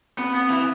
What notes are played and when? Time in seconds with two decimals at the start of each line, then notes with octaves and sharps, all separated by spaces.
0.18 B3 C4
0.34 B3 C4
0.50 E3 C4